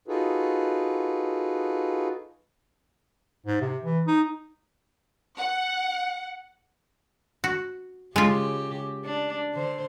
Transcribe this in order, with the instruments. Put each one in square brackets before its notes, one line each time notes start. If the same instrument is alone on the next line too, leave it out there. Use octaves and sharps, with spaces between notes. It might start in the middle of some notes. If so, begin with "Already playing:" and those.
[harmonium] D#4 F4 F#4 G#4 A4 B4
[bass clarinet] G#2
C3
E3
D#4
[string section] F#5
[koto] F#4
[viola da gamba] C#3 G4 [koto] G#3 F4
[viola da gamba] D4
D3 C5